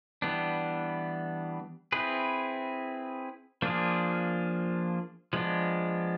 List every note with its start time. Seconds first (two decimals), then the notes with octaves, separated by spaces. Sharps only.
0.22 E3 G3 B3 D4
1.92 C4 E4 G#4 B4
3.62 F3 A#3 D4 F4 G#4
5.33 F3 G#3 B3 D4